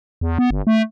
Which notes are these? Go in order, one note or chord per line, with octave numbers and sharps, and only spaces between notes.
E2
B3
G1
A3